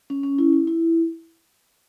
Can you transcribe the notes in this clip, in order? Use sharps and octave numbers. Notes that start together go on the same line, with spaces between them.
C#4
C#4
E4
E4
E4